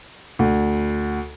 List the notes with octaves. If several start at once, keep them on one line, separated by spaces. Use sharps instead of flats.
D2